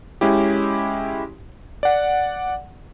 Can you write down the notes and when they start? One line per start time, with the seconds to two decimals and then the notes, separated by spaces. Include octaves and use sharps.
0.21 G#3 C#4 E4 G4
1.83 D5 F#5